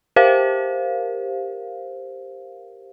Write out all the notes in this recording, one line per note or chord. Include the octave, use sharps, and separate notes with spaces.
G4 A#4 C5 F5